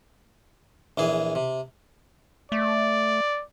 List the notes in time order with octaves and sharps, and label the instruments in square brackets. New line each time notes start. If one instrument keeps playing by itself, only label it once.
[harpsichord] A#1 E3 G#4
C3
[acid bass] A3 [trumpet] D5